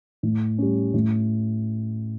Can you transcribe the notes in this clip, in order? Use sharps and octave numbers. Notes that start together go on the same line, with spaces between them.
A2
G3 C#4
A2